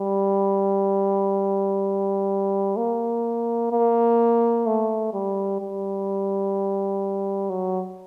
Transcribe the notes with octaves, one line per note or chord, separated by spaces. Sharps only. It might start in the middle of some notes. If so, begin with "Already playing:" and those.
Already playing: G3
A#3
A#3
A3
G3
G3
F#3